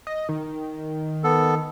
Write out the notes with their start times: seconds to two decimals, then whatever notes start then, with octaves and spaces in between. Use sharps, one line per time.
0.07 D#5
0.29 D#3
1.24 B3 A4